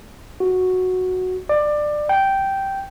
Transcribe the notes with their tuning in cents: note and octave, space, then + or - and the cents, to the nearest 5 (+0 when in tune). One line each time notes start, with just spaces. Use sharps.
F#4 -5
D5 +20
G5 -10